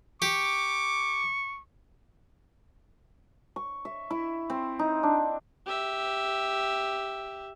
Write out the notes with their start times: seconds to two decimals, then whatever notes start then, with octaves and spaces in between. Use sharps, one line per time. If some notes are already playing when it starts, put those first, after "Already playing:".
0.22 G4 C#6 D6
3.56 C#6
3.85 E5
4.11 E4
4.50 C4
4.79 D#4
5.03 D4
5.66 G4 E5